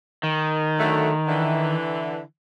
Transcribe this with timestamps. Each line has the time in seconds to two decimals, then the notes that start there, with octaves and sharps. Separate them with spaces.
0.23 D#3
0.78 D3 F#3 A3
1.28 D3 E3